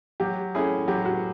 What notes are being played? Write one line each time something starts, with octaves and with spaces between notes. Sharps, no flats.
F#3 G4
A3 C#4 E4 G#4
F#3 G4
F#4